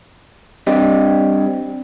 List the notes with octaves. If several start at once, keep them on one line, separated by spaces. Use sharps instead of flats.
G3 C4 D4 G4 D#5